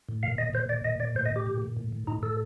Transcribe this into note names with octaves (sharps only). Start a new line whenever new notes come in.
A2
A#2 F5
A#2 D#5
A#2 C5
A#2 D5
A#2 D#5
A#2 D5
A2 C5
D#5
A2 G4
A#2
A#2
A2
A2
A2 D#4
A2 A4